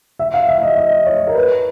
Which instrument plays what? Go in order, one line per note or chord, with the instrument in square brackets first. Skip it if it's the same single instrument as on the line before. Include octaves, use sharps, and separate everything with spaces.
[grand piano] E5
F5
E5
D#5
D#5
C#5
A#4
B4